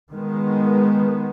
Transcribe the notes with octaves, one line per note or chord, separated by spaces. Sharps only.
D#3 G#3 B3